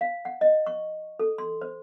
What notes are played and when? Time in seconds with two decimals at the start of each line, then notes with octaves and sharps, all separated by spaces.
0.01 F5
0.25 F#5
0.41 D#5
0.66 C#6
1.19 A4
1.38 C6
1.61 C5